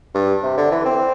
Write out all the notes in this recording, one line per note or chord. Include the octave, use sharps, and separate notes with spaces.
G2
C3
D3
E3
C4